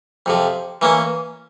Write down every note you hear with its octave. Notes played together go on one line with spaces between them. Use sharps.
F2 C3 F3
E3 A#3 C#4